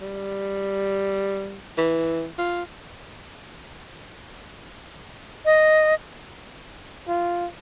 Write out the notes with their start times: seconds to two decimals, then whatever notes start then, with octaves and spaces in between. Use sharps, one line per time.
0.01 G3
1.78 E3
2.38 F4
5.45 D#5
7.08 F4